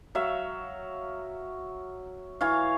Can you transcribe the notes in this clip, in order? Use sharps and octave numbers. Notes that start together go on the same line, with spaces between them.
F#3 E5 F5
E3 C#5 F5